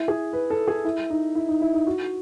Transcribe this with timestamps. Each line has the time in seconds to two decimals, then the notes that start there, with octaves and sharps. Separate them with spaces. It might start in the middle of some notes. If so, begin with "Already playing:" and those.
Already playing: E4
0.08 G#4
0.33 B4
0.50 A4
0.68 G#4
0.84 E4
1.10 D#4
1.35 E4
1.48 D#4
1.61 E4
1.74 D#4
1.87 F#4